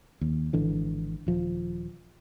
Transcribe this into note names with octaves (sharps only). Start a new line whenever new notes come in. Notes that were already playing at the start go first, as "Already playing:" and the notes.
D#2
G#1 D3 E3
D#1 F3